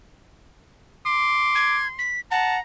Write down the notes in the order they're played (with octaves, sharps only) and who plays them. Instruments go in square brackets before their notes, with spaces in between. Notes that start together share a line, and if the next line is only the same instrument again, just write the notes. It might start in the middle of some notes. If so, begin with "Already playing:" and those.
[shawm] C6 [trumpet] D6
[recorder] G#6
B6
[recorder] F#5 [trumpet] A5 [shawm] A#5